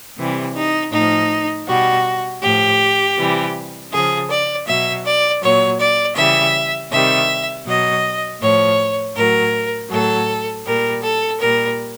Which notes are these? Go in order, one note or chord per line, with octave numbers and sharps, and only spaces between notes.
C3 E3 G3
D#4
A2 F3 D#4
B2 G3 F#4
A2 F3 G4
C3 E3 G3
C#3 F3 G#4
D5
B2 F#3 E5
D5
A#2 F#3 C#5
D5
C#3 E3 G3 E5
C3 D#3 G3 E5
B2 F#3 D#5
A2 F3 C#5
A2 F#3 A#4
A2 F#3 A4
A#2 G3 A#4
A4
A#2 G3 A#4